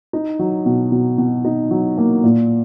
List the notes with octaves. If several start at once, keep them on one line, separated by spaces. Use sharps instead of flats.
D#4
F#3
B2
B2
B2
D#4
F#3
A#3
A#2